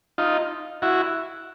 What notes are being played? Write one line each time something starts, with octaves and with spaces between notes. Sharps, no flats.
D#4 F4
E4 F#4